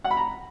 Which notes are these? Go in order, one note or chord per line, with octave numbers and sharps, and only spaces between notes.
F#5
B5
A#5